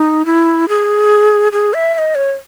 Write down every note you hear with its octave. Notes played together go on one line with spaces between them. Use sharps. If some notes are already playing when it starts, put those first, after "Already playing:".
Already playing: D#4
E4
G#4
G#4
E5
E5
D#5
C#5